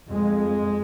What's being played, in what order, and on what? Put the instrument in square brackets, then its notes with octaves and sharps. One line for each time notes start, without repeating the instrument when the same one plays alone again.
[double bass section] F2 G#3